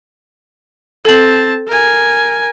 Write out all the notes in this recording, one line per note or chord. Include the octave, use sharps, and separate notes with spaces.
C4 A4 A5 F#7
A#4 G#5